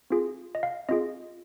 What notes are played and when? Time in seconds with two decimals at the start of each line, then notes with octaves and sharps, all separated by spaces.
0.10 C4 F4 G#4
0.55 D#5
0.63 F5
0.89 C4 F4 G#4 D#5